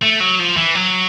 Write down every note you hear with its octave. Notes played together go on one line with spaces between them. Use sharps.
A3
F#3
F3
E3
F#3